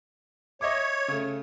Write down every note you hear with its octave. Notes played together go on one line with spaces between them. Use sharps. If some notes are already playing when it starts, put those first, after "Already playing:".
C#5 D#5 E5 D6
C#3 A3